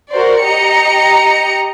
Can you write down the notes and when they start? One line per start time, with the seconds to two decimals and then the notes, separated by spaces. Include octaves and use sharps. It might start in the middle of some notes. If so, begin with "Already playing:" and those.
0.12 F#4 A#4 C5 D5
0.43 G4 D#5 A#5 C#7